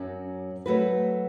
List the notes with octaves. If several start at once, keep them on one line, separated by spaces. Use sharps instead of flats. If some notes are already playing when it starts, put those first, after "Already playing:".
Already playing: F#2 F#3 C#4
F#3 A3 F#4 B4